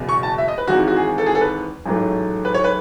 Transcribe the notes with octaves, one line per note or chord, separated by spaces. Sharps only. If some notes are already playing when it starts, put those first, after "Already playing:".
Already playing: F#1 E2 B2
C#6
A5
E5
D#5
B4
G#1 G#2 E3 G#3 F#4
F#4
G#4
A4
G#4
A4
B4
A1 G#2 F#3 A3
B4
C#5
B4